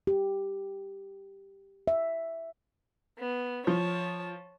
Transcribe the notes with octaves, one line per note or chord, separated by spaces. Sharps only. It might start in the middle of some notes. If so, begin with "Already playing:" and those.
G4
E5
B3
F3 C#5 A5